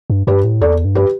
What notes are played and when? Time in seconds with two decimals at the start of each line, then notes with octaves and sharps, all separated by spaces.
0.10 G2
0.27 G2 G4 B4
0.44 A2
0.61 E2 A4 D5
0.85 G2
0.95 G4 B4